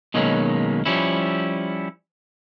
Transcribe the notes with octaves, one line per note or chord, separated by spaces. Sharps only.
B2 D#3 F#3 G#3 A#3 C#4
F3 G3 C#4 E4